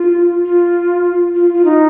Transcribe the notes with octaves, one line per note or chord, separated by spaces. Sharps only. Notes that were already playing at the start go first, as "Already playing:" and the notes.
Already playing: F4
F4
F4
F4
D#4